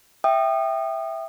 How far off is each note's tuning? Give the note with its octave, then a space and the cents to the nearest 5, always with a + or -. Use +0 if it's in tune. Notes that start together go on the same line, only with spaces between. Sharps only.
E5 +0 G5 +0 D#6 -30